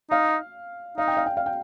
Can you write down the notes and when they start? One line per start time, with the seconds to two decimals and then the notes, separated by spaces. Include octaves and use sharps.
0.10 D#4 F5
0.97 D#4 F5
1.08 G5
1.17 F5
1.26 G5
1.37 F5
1.46 G5